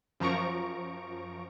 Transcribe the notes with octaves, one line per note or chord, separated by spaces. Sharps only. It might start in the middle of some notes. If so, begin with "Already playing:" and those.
F#2 F3 A#5 C#6 D7